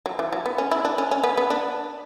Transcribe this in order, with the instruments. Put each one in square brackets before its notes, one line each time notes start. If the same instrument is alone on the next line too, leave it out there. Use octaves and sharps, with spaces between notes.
[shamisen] F#3
E3
F#3
B3
C#4
E4
D4
C#4
C#4
B3
B3
D4